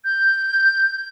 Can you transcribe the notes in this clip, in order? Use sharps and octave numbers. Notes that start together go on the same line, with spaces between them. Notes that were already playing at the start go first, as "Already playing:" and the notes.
G6